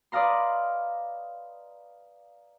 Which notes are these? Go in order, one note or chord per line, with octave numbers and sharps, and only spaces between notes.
B4 D5 D#5 F5 A#5 C6